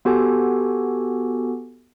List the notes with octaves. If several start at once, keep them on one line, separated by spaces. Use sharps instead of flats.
B3 F#4 G4 A4 G#5